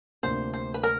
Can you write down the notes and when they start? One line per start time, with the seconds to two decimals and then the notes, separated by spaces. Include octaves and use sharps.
0.23 D2 C3 F3 A#3 D4 C5
0.54 C5
0.74 B4
0.83 A#4